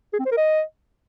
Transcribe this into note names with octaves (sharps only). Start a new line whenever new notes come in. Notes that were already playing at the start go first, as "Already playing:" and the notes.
G#4
C4
C5
A#4
D#5